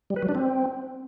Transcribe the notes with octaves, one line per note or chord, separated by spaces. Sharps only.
G3
B4
F#3
D4
C4